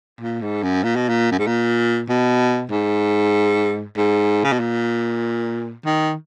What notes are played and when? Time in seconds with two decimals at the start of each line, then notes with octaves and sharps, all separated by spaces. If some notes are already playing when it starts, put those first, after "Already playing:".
0.21 A#2
0.42 G#2
0.63 F#2
0.83 A#2
0.96 B2
1.09 A#2
1.32 F#2
1.39 G#2
1.47 A#2
2.09 B2
2.72 G#2
3.97 G#2
4.44 C#3
4.52 B2
4.60 A#2
5.86 D#3